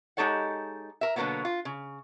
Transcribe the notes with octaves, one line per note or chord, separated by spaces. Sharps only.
G#3 D#4 G4 A4 C#5 F#5
A#4 E5
B2 D3 D#3 F#3 A#3 B3
F4
C#3